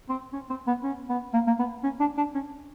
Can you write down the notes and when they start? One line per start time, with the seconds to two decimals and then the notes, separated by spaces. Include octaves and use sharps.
0.09 C4
0.33 C#4
0.50 C4
0.67 B3
0.84 C#4
1.10 B3
1.34 A#3
1.47 A#3
1.59 B3
1.83 C#4
2.00 D4
2.17 D4
2.35 C#4